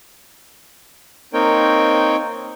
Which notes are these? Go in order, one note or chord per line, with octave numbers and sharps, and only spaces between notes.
A#3 C4 D#4 A#4 C#5 G5